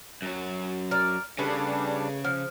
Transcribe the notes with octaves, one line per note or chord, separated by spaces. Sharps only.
F#2 F#3
A#4 D5
C#3 G3 A3 D4 G#4 B4
F3